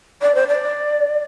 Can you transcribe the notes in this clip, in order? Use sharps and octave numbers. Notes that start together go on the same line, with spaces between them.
D5
C5
D5